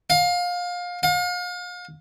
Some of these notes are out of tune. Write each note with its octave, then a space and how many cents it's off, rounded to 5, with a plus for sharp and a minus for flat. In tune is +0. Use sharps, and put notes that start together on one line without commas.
F5 +25
F5 +40